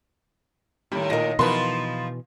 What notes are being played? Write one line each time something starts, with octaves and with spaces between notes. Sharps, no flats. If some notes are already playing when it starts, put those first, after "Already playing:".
A2 D#3 G3
A#2 D#4 A#4 A#6
B2 E3 F3 D#4 A#4 B4 B5 C6